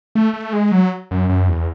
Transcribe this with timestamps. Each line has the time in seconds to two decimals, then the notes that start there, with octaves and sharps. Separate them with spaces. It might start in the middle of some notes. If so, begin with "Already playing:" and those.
0.15 A3
0.34 A3
0.53 G#3
0.72 F#3
1.11 F#2
1.29 F#2
1.49 E2